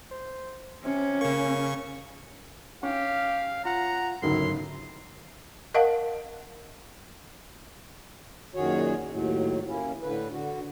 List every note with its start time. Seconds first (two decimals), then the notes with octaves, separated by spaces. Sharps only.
0.11 C5
0.84 C3 C#4
1.21 C#3 A#3 C#6
2.83 C#4 G4 F5
3.65 F4 F#5 A#5
4.22 G1 C#2 G#2 D3 F#3 E4 A#4 C6
5.74 A#4 D#5 F5 F#5 A5
8.55 F#2 A#2 D#3 F#4 G#4 C#5
9.09 D#2 A2 F#3
9.67 A#3 C#4 E4
10.01 A2 D3 B4
10.31 D3 F#4